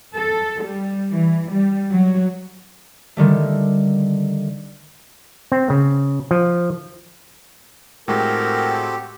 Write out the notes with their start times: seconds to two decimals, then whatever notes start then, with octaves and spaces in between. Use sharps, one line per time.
0.14 A4
0.63 G3
1.11 E3
1.52 G3
1.91 F#3
3.17 D3 D#3 G3 A3
5.52 C4
5.70 C#3
6.31 F3
8.08 A2 G#3 C4 F#4 G4 A4 A#4